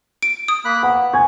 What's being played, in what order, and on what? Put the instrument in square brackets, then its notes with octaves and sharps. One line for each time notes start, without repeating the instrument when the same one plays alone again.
[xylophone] D7
D#6
[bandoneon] A#3 B5 F#6
[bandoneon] B3 [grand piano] F#5
[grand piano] G#5 C#6 G#6